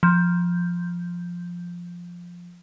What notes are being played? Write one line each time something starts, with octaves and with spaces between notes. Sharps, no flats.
F3 G6